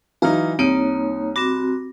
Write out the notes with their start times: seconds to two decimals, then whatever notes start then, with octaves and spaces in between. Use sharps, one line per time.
0.22 E3 F#3 D#4 F5 A#5 F6
0.59 C2 A#3 C4 D#4 C#5 D#7
1.36 C4 F#4 B5 D6 A#6